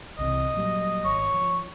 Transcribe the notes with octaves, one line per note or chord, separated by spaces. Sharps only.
C2 C3 E3 D#5
A#2 F#3 G3
G#1 C#5
F3